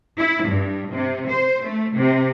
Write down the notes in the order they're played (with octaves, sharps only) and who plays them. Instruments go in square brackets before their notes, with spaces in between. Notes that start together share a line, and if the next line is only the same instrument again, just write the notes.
[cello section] E4
G2
C3
C5
A3
C3